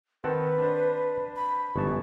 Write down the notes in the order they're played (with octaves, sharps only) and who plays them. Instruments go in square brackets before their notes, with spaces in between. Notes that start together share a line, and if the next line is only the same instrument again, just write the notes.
[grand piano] D#3 [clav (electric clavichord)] C4 F#5 A5 [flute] B4
[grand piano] D4 C5
[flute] B5
[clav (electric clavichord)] G1 A5 [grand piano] F#2 E3 [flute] C#6